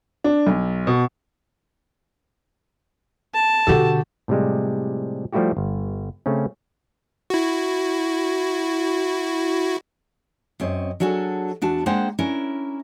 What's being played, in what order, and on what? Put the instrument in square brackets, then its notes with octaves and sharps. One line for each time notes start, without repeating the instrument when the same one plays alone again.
[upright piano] D4
B1
B2
[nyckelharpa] A5
[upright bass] B2 D3 [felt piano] F#4 G4 A4
[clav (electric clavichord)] A2 C3 F3 G3 G#3
F3 G3 A3 E4 F#4 G4
G1
C#3 A3 C4 C#4
[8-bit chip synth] E4 F#4
[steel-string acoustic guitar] F#2 C4 C#5 D#5
F#3 D4 F#4 G#4 A4
E2 D4 F#4 A5
G#3 A#3 D4 C5 F#5 G5
C#4 D4 E4 A#4